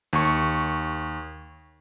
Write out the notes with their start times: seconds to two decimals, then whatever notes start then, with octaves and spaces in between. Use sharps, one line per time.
0.13 D#2 C#6